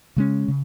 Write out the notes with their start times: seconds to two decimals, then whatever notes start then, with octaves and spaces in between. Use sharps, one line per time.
0.16 C#3 G#3 C#4
0.48 C#3